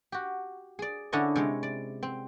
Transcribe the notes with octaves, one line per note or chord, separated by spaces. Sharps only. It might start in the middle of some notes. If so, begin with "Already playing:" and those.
F#4 G4
G#4 D5
D3 C#4 D4 E4 C#5 D#5
C3 G#3 C#5
D5
C4